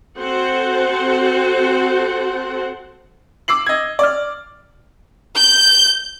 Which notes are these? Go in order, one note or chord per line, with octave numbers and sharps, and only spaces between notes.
C4 F#4 A4 C5 F#5
D6 E6 C7 F#7
D#5 G#6
D5 F6
G6